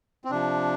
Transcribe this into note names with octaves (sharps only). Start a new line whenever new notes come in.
C4
C3 F3 D4